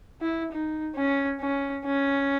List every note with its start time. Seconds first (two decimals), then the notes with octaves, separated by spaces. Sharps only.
0.21 E4
0.52 D#4
0.96 C#4
1.40 C#4
1.86 C#4